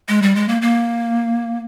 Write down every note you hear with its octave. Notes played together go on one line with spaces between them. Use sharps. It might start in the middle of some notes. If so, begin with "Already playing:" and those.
G#3
G3
G#3
A#3
A#3